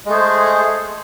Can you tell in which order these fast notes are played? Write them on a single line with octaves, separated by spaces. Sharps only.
G#3 A3 G#4 C5